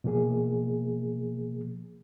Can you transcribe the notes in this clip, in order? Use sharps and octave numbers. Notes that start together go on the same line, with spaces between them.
B2 F3 A#3 G#4